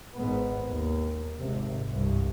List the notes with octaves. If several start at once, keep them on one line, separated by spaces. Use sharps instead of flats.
G#1 G#2 B3
D#2
G#1 C3
C2 G2